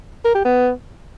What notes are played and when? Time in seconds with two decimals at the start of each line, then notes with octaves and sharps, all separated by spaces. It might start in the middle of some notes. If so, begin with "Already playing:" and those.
0.25 A#4
0.35 G4
0.45 B3